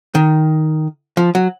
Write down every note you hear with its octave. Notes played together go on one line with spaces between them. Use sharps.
D#3
F3
F#3